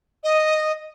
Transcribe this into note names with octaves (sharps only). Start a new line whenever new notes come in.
D#5